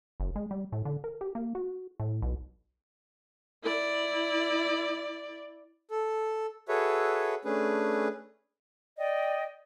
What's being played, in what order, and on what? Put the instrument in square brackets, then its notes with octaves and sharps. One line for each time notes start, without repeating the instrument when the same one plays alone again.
[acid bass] F#1
G#3
G3
A2
D3
A#4
G4
A#3
F#4
A2
B1
[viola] E4 D5
[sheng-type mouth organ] A4
F#4 G#4 A4 B4 C#5 E5
A3 C#4 D4 G#4 B4
[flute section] D5 D#5 G5